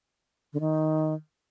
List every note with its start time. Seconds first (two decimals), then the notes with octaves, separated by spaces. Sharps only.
0.53 D3
0.60 D#3